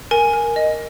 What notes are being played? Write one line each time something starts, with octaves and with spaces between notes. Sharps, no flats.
A#4 G#5
A#4
D#5